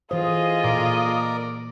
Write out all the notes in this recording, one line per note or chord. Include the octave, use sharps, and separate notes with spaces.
E3 F4 G#4 A4 C5 D#5
A#2 A#4 D5